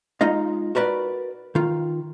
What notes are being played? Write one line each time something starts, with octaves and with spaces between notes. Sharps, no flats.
G#3 D#4 F4 D#5
F#4 A#4 B4 D5
D#3 F4